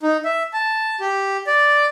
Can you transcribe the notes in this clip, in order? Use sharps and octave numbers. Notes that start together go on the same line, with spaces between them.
D#4
E5
A5
G4
D5